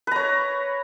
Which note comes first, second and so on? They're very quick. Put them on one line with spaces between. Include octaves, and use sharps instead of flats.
B4 A#5 C#5